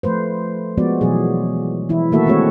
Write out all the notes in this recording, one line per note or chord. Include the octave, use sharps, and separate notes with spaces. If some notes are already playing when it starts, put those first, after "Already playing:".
F3 A3 B4 C5
F3 G#3 B3 F#4 D5
B2 E3 F#3 G#4
E3 E4
D#3 A3 A#3 F#4 A4 E5
G#3 A3 C4 F#4 C#5